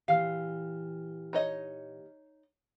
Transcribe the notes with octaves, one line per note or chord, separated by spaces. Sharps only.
A#2 E3 G4 F5 F6
D#4 C#5 D#5